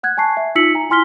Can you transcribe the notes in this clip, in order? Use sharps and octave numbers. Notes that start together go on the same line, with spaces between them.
F#5 F#6 G#6
G#5 A5 C#6 C7
E5
D#4 F4 E6 B6 C#7 F#7
G#5 A#5
E4 G#5 C6 F6 B6 G7